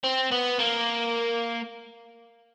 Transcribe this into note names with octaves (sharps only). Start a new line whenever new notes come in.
C4
B3
A#3